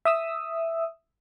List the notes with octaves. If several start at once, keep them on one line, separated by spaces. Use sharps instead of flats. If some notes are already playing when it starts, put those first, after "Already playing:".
E5 D#6 E6